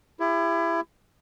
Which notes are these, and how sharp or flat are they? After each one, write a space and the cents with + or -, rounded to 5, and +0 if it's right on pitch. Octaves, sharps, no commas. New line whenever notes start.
E4 +25 G4 +35